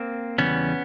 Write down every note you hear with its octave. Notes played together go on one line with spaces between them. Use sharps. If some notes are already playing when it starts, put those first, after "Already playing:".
Already playing: A#3 C4
E2 C#3 E3 G3 B3 C#4